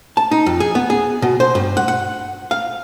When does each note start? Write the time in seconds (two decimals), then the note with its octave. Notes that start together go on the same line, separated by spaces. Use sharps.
0.17 A5
0.31 D#4
0.46 F2
0.60 G#4
0.75 B3
0.90 G#4
1.22 B2
1.40 C5
1.55 G2
1.77 F#5
1.88 F#5
2.51 F5